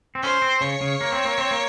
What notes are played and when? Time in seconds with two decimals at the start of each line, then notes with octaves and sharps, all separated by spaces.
0.15 C4
0.23 C#4 C5
0.42 C4
0.61 C#3 C#5
0.81 C#3
1.01 A#3
1.12 C4
1.25 A#3
1.38 C4
1.51 A#3